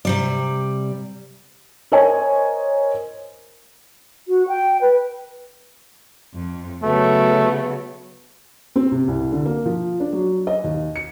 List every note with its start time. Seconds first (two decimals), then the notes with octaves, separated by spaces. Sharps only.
0.05 C3 G3 D5
1.92 A#4 C5 C#5 D#5 G#5
4.28 F#4
4.48 G5
4.81 B4
6.35 F2
6.83 C#3 F#3 A3 B3
8.76 C4
8.92 C3
9.08 C2
9.32 D3
9.46 A#3
9.66 F3
10.00 D4
10.13 F#3
10.47 D#5
10.64 D#2
10.96 C#7